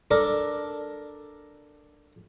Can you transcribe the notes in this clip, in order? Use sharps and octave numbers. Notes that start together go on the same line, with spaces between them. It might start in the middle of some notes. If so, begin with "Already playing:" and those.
D4 A4 A#4 D5